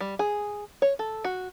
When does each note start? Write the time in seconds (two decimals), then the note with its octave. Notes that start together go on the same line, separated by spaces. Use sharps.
0.01 G3
0.19 G#4
0.82 C#5
0.99 A4
1.24 F#4